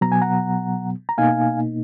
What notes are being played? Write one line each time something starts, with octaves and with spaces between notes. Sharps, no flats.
B2 F#3 B3 A#5
G#5
F#5 A#5
A#5
B2 A#3 D#4 F5 G#5